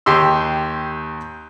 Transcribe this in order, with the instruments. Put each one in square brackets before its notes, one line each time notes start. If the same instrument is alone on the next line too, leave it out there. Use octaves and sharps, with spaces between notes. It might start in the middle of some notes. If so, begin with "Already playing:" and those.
[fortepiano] D#2 G4 C6 E6